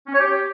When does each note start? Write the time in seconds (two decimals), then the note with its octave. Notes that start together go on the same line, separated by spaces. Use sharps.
0.06 C#4
0.13 C#5
0.19 G4